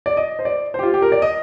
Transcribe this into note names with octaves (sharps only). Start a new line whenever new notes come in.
D5
D#5
C5
D5
C5
G4
F4
G4
A#4
D5
D#5